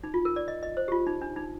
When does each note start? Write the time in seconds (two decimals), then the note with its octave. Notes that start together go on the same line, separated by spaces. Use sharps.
0.04 D#4
0.14 F4
0.25 A#4
0.36 D5
0.48 D#5
0.63 D#5
0.77 C5
0.88 G4
0.92 F4
1.07 D#4
1.22 D4
1.36 D#4